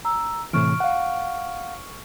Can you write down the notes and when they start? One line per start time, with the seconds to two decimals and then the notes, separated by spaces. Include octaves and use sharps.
0.05 A#5 E6
0.53 A2 C3 E3 C#6 F6 D7
0.80 F5 F#5